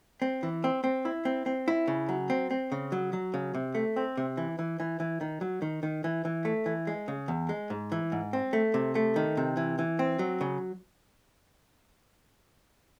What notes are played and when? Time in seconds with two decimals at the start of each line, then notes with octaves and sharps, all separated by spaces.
0.22 C4
0.43 E3
0.64 C4
0.84 C4
1.05 E4
1.25 C4
1.46 C4
1.68 E4
1.88 C#3
2.09 F#3
2.30 C4
2.51 C4
2.72 C#3
2.92 F#3
3.13 F#3
3.34 C#3
3.55 C3
3.75 A3
3.96 C4
4.17 C3
4.37 E3
4.59 E3
4.80 E3
5.00 E3
5.21 D#3
5.41 F#3
5.62 D#3
5.83 D#3
6.04 E3
6.25 E3
6.45 A3
6.66 E3
6.87 G#3
7.08 C#3
7.28 E2
7.49 G#3
7.70 G#2
7.92 E3
8.12 G#2
8.33 C4
8.53 A3
8.74 C3
8.95 A3
9.16 D#3
9.37 C3
9.57 E3
9.79 E3
9.99 C4
10.19 F#3
10.41 C#3